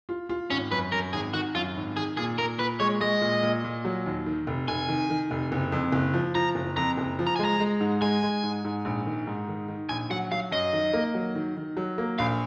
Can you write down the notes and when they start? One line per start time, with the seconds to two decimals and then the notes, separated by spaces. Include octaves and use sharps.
0.09 F4
0.29 F4
0.50 G#1 C#4
0.71 F#2 B4
0.92 F#2 A#4
1.13 G#1 G#4
1.34 D#3 F#4
1.55 F#2 F4
1.76 G#1
1.97 D#3 G#4
2.17 A#2 G#4
2.38 A#2 A#4
2.59 A#2 B4
2.80 G#3 C#5
3.00 G#3 D#5
3.21 A#2
3.43 A#2
3.64 A#2
3.85 F#3
4.06 D#2
4.26 D#3
4.47 F1
4.68 F1 G#5
4.88 D#3
5.10 D#3
5.31 F1
5.52 F#1
5.72 F2
5.92 F#1
6.13 F3
6.35 F3 A#5
6.55 F#1
6.77 F2 A#5
6.98 F#1
7.19 F3
7.27 A#5
7.36 G#3 G#5
7.45 A#5
7.60 G#3
7.80 G#2
8.01 G#3 G#5
8.23 G#3
8.43 G#2
8.65 G#2
8.85 A#1
9.06 D#3
9.27 G#2
9.48 D#3
9.68 D#3
9.89 A#1 G#5
10.10 F#3 F#5
10.31 F#3 F5
10.51 F#2 D#5
10.73 D#3
10.93 A#3
11.15 F#3
11.35 D#3
11.57 D#3
11.77 F#3
11.98 A#3
12.19 A#1 F5